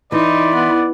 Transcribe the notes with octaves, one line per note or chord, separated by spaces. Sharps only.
E3 D#4 D5 E5 B5 C6
B3